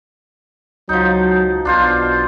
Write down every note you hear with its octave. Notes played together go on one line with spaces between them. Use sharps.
C#2 F3 F#3 D#4
B1 B2 D4 F4 C5